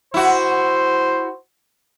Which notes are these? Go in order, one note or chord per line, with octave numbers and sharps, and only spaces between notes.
E4 F#4 C5